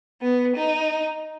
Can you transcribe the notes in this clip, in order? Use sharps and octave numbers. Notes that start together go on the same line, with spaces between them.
B3
D#4